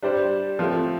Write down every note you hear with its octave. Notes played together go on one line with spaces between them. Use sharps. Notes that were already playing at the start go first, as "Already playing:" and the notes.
G3 D4 G4 C5
F3 A3 C4